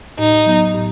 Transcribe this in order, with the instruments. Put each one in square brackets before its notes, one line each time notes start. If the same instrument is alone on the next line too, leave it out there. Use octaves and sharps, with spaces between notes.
[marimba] A2 [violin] D#4
[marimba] F#3 B3
A2